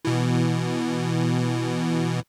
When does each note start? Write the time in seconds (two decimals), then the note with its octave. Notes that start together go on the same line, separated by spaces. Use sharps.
0.05 B2 E3